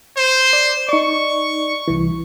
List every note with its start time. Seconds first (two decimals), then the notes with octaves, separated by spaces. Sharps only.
0.17 C5
0.50 D5 C7
0.89 D#4 D5 C#6
1.88 C2 E3